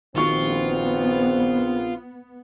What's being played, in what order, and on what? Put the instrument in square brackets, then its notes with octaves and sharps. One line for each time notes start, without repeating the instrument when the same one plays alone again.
[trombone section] A#1 C4 [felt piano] D#3 F#4 C#6 [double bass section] B3 [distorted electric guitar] F4